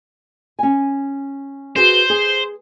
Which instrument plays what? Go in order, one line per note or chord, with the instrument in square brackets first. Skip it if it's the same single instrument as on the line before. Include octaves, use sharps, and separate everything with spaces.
[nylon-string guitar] C#4 G#5
[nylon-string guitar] F#4 G#4 B4 [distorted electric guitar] C5
[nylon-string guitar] G#4